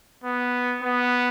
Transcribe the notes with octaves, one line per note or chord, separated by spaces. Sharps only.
B3
B3